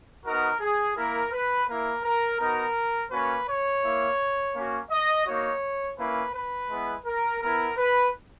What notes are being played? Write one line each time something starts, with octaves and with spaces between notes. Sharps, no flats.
B3 D#4 F#4 A#4
G#4
A#3 E4 A#4
B4
A#3 E4 A#4
A#4
B3 D#4 F#4 A#4
A#3 C#4 F#4 B4
C#5
A#3 E4
A#3 C#4 F#4
D#5
A#3 D#4 F#4 C#5
A#3 C#4 E4 B4
B4
G#3 B3 E4
A#4
B3 E4 A#4
B4